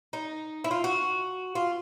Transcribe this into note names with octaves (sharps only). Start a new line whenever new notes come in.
D#4
E4
F4
F#4
F4